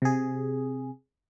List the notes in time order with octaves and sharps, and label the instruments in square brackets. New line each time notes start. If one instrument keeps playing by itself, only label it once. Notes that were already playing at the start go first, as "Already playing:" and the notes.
[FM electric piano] C3 G#4